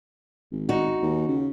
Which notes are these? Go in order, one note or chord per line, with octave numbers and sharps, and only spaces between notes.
G#1
D#4 F#4
D#2
C#3